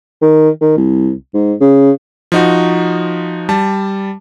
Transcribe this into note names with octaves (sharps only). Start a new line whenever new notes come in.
D#3
D#3
C2
G#2
C#3
F3 D#4 F#4
G3 A5